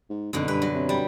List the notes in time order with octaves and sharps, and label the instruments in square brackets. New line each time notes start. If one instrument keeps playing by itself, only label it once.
[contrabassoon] G#2
[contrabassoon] G#1 [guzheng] F#2 B2 D3
[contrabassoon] G2 [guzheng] B4
[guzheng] F#3
[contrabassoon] C3
[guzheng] G3